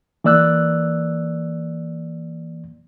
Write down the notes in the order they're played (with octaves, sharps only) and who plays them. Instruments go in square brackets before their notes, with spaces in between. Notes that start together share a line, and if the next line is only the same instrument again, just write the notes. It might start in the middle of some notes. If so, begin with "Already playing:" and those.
[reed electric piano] E3 A#3 D5 E6 F#6